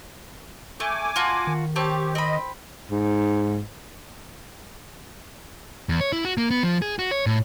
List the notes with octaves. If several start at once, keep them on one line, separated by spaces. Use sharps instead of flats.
A3 G#5 D6
F4 F#4 A5
D#3
C4 G4 C#5 A5
C4 D#5 B5
G#2
E2
C#5
E4
F#4
A#3
B3
F3
G#4
F#4
C#5
A2